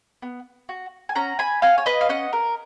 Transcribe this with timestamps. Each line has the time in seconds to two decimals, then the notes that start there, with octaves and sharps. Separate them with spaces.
0.22 B3
0.69 F#4
1.09 G#5
1.15 C#4 F#5 A#5
1.39 G#5 B5
1.62 F#4 F5 G#5
1.78 C#5
1.86 B4 D#5
2.01 F5
2.09 C#4 D#5 F#5
2.33 A#4